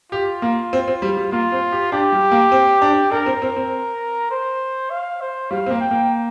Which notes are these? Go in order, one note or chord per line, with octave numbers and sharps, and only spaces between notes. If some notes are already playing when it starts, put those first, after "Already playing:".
F4 G4
A#3
C4
C4
G3
G3
A#3 F4
C4
G4
D4 G4
G3
A#3
C4
D4
D4 A#4
C4
C4
C4
C5
F5
C5
G3 F5
C4
A#3
G5
A#3